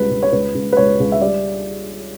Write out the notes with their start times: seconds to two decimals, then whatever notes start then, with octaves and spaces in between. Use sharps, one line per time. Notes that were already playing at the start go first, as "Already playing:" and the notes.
Already playing: C#2 G3 B4
0.10 C#2
0.23 C#5
0.32 C#2 B4
0.55 C#2
0.73 B4
0.77 C#2 C#5
1.00 C#2
1.12 E5
1.21 G3 D5